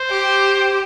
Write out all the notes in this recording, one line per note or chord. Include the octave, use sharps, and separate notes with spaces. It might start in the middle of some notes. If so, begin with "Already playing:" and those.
Already playing: C5
G4